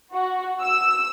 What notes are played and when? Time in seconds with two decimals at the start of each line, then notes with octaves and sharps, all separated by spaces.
0.14 F#4
0.62 E6